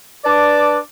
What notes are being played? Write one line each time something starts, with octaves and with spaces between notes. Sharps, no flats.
D4 B4 D5 A5 D6